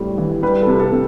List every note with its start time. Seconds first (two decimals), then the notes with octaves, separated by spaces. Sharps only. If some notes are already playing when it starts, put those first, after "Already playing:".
Already playing: A2 G3 C4
0.18 E3
0.43 G3 B4
0.62 A4
0.67 C3
0.80 A4
0.92 C3